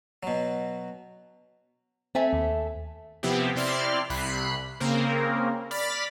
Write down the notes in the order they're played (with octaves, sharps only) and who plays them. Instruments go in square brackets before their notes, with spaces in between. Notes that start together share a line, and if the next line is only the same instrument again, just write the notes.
[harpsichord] B2 F#3
[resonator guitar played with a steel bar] A3 E5 G#5 [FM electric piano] C4
[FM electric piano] D#2
[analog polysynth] C3 F3 B3 C4 E4 G4
C3 C4 E4 D5 C6 F6
C2 C3 B5 F#6 C7
C#3 A#3 C4 A#4
D5 B5 F6 A6 B6